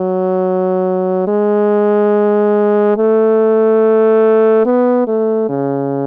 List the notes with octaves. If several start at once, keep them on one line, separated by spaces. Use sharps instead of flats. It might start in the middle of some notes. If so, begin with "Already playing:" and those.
Already playing: F#3
G#3
A3
B3
A3
C#3